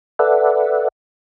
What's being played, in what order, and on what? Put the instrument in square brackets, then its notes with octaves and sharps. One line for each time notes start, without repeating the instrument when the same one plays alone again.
[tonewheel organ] A4 B4 D5 E5 F#5